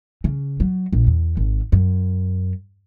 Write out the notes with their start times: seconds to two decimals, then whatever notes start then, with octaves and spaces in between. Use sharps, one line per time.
0.24 C#3
0.60 F#3
0.93 A#1
1.07 E2
1.37 G#1
1.72 F#2